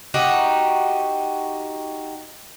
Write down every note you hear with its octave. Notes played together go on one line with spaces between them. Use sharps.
D#4 F#4 G4